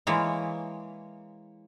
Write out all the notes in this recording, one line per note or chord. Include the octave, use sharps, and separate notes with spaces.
E3 G#3 A#3 C#5